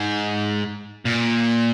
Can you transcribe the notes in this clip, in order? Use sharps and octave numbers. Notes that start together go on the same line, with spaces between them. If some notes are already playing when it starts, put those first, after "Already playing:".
Already playing: G#2
A#2